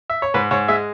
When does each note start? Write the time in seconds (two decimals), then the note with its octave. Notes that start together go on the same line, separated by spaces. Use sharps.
0.10 E5
0.22 C#5
0.34 G#2 B4
0.51 G#2 C#5
0.68 G#3 E5